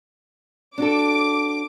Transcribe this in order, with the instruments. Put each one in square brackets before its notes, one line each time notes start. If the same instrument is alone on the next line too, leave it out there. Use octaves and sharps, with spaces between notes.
[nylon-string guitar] D4 F#4 A4 [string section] D6